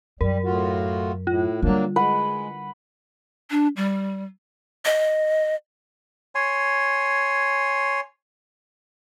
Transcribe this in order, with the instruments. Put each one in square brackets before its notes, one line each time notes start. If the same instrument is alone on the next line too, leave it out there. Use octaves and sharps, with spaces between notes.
[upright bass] F#2 [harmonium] G3 [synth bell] A#4
[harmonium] A2 F4 F#4
[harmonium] A2 [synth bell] F4
[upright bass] D3 G3 [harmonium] F#3 A#3 D4
[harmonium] G#3 [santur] B4 F#5
[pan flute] D4
G3
D#5
[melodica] C#5 G#5 C6